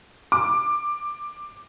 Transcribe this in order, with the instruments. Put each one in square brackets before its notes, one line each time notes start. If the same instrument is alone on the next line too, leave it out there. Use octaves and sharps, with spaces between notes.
[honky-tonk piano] D6